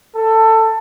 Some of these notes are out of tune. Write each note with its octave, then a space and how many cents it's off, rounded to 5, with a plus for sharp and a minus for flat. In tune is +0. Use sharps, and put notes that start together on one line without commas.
A4 +15